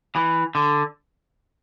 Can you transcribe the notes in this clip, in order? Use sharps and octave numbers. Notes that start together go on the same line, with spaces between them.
E3
D3